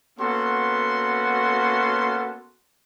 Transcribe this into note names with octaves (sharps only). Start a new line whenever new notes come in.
A#3 B3 C#4 F#4 A4 C6